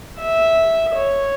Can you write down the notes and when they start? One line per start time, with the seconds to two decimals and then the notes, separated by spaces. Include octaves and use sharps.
0.18 E5
0.95 C#5